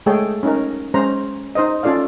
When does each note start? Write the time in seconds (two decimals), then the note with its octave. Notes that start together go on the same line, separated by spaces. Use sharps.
0.06 G#3 A3 G#4 A4 C#5 G5
0.43 C#4 D#4 A#4
0.94 G#3 C#4 C5 A#5
1.55 D#4 C5 D#5
1.83 C#4 F4 A4 D5 F5